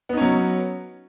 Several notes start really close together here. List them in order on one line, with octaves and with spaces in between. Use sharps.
B3 D#4 C#4 F#3